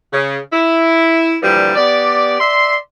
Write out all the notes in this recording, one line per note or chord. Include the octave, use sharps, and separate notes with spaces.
C#3
E4
A#2 D3 E3 F3 G3
B3 G4 D5
D5 E5 C6